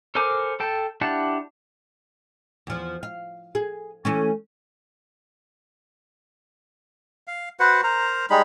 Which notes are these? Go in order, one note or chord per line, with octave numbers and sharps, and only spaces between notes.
A4 A#4 C5 G#5 D6
A4 G5 A5
D4 E4 G4 F#5 A5
E2 F3
F5
G#4
E3 A3 C#4
F5
F#4 B4 C5 F#5
A#4 C5 A#5
G3 G#3 D#4 B5